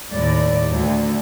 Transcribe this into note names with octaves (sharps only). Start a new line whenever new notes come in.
D#2 A2 D5
D2